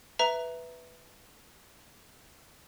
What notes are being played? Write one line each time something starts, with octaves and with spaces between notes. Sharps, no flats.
B4 E5 A#5